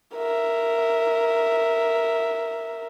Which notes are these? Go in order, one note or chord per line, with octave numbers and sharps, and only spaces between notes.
A#4 E5